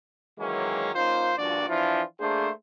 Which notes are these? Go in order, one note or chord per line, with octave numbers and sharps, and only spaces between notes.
D#3 E3 F#3 G#3 A#3 C#4
A#3 C#4 D#4 F4 C5
G2 A#2 F3 D4 F#4 D5
E3 F3 D4 E4 F4
A3 A#3 D4 G#4 C5